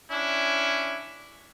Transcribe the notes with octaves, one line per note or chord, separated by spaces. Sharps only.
C#4 D4 E4